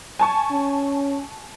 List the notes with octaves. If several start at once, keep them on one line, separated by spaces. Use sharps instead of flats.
G#5 A5 C#6
C#4